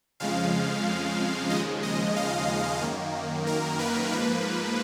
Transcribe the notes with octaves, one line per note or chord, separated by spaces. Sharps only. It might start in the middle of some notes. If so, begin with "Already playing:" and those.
F2 C#3 F3 G#3 F5
D#2 C#3 F3 G#3 D#5
D#5
F5
F#2 D#3 A#3
A#4
B4
G#2 F3 A#3 B4